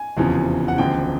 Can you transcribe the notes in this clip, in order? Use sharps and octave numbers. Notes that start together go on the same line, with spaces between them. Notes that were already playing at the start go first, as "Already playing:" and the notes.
Already playing: G#5
F1 E2 C#3 F3
F#5
E1 D2 C#3 F3 G5